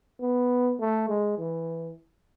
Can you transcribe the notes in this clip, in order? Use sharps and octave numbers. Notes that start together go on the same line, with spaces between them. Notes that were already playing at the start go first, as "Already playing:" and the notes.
B3
A3
G#3
E3